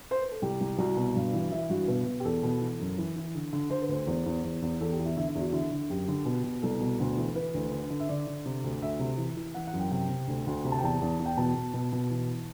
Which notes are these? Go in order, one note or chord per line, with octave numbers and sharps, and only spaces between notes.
C5
B4
A4
C2 G4
C2
C2 F#4
B2
G2
E3
E3 E4
G2 F#4
B2 B4
B2
G4
E2 A4
B2
E3
F#2
E3
E3
D3
D3
D3 C5
B4
D2 C5
E2
E2
E2
E2
E2 A4
G4
E2
E4
D3 E4
E4
E2
F#4
D3 E4
D3
F#2 G4
D3
B2
B2
C2 A4
B2
D2
E3
E3 B4
D2
D3
D3
E5
D3 D5
D3
C3
D2
D2 E5
C3
E3
E3
E3 F#5
F#5
F#2
G5
C3 G5
C3
D2
D2
C3
A5
G5
E2 A5
E2
E2
G5
B2 A5
B2
B2
B2
E3